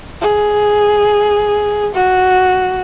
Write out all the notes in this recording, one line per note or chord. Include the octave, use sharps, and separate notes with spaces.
G#4
F#4